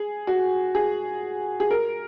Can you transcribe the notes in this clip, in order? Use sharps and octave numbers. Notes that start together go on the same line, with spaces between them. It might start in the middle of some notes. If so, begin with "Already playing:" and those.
Already playing: G#4
F#4
G#4
G#4
A#4